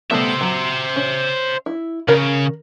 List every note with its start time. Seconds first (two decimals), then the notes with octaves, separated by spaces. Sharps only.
0.11 G3 A3 B3 C5 E5
0.41 F#3
0.96 C#4
1.66 E4
2.08 C#3 A#4 B5